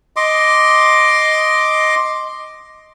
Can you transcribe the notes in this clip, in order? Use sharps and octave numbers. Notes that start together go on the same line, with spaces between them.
D#5 C6 D6